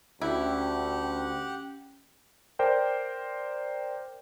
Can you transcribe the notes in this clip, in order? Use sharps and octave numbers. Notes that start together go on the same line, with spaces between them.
D2 C#4 E4 G4 F#5 G5
A#4 C5 D5 G5